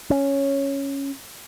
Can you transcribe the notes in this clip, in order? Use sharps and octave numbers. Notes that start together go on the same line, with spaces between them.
C#4